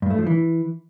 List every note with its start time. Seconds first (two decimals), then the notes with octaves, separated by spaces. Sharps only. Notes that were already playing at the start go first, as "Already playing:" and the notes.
0.02 G2
0.10 A3
0.18 F3
0.26 E3